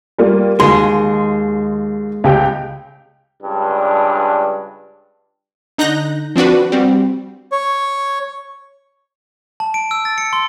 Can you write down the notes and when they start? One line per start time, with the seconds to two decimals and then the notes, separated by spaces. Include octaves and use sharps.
0.18 G3 A#3 F4
0.60 D#2 G#3 C6
2.24 C#2 G4 G5
3.43 C#2 G2 D4
5.78 D3 D#4 A#5 F#6 G6 A#6
6.36 F3 C4 D4 F#4 B4
6.72 G3 C4 F#4
7.52 C#5
9.60 A5
9.74 D7
9.91 E6
10.05 A6
10.18 C#7
10.33 C6